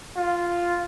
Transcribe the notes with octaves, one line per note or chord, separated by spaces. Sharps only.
F4